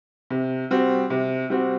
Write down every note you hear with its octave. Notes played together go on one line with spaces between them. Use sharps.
C3
G3 C4 F#4
C3
G3 C4 F#4